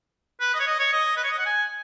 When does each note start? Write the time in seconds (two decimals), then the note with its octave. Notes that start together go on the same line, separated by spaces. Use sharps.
0.40 B4
0.54 D#5
0.59 C#5
0.67 D#5
0.79 C#5
0.93 D#5
1.17 B4
1.24 C#5
1.30 D#5
1.38 F#5
1.45 G#5